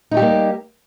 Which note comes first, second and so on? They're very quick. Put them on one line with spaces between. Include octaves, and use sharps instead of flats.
D#4 A3 G4 G3 A#3